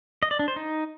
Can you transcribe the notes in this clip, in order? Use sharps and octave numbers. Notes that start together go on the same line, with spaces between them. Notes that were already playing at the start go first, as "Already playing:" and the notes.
D#5
D5
D4
C5
D#4